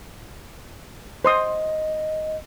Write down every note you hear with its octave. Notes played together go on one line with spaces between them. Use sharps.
C5 D#5 C6 D#6